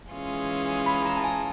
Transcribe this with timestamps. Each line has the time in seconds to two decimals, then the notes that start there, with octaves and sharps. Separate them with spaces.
0.11 E3 G#3 C#4 F4 G#4
0.86 B5
1.06 A#5
1.17 A5
1.24 G#5